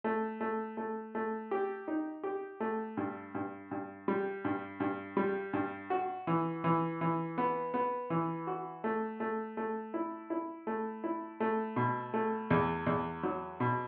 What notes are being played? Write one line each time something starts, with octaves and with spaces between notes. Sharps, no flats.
A3
A3
A3
A3
G4
D#4
G4
A3
G2
G2
G2
G3
G2
G2
G3
G2
F#4
E3
E3
E3
B3
B3
E3
F#4
A3
A3
A3
E4
E4
A3
E4
A3
B2
A3
E2
E2
F#3
B2